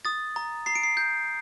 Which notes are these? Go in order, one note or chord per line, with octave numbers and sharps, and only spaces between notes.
D#6 A6
A#5
A#5 C7
D7
C7
G6